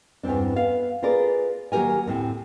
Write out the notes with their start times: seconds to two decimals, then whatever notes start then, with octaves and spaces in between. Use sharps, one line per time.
0.23 E2 G2 E3 C4 D4
0.56 B3 F5
1.02 F4 G#4 A#4 B4 D5
1.72 D#3 F#3 A#3 G4 A#4 G#5
2.06 D2 A2 C4